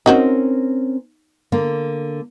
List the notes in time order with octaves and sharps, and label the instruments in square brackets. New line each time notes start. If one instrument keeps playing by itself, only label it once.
[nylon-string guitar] C4 C#4 A#4 [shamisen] D#4 F#4 C5
[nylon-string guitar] D3 A#3